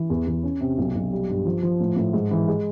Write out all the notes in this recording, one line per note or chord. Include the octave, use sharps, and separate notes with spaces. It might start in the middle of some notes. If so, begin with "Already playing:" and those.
Already playing: E3
E2
E2
C#4
C3
B1
B1
G3
G2
F3
F3
A2
A2
G#2
E3
G#3